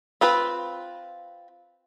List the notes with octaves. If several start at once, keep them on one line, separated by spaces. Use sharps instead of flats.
C4 F4 B4